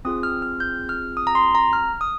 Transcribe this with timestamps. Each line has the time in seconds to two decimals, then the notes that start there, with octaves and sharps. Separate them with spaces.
0.05 C4 F4 G#4 D#6
0.23 F6
0.42 F6
0.60 G6
0.89 F6
1.17 D#6
1.27 A#5
1.35 C6
1.55 A#5
1.73 F6
2.01 D#6